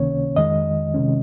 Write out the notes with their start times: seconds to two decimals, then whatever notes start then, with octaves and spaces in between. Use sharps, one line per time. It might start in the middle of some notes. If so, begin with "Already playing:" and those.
Already playing: C#2 C3 D#3 A#3 C#4 C#5
0.36 F2 D#3 G#3 D#5
0.94 C3 D#3 G#3 C#4